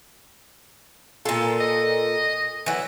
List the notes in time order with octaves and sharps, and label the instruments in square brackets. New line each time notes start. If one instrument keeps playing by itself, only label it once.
[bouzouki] A#2 A4 [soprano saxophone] F4
[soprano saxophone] D#5
[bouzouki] E3 F#3